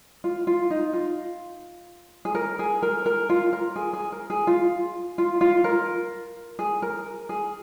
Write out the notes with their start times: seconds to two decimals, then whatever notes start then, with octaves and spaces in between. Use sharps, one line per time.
0.24 F4
0.47 F4
0.70 D#4
0.93 F4
2.25 G#4
2.35 A#4
2.59 G#4
2.82 A#4
3.06 A#4
3.30 F4
3.53 A#4
3.76 G#4
3.93 G#4
4.12 A#4
4.30 G#4
4.47 F4
5.18 F4
5.41 F4
5.64 A#4
6.59 G#4
6.82 A#4
7.29 G#4